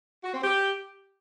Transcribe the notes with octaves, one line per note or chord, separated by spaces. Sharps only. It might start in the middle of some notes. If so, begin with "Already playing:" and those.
F#4
C4
G4